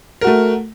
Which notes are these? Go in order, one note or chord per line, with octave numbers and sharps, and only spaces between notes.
A3 F#4 A#4